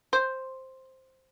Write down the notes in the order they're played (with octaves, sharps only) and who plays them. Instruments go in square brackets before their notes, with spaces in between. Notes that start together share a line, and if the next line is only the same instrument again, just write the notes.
[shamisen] C5